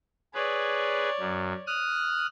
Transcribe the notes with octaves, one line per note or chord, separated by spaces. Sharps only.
G#4 B4 C#5 D5
F#2
D#6 F6 F#6